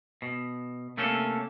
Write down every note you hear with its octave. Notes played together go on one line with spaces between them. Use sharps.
B2
C3 A3 A#3 C#4 A4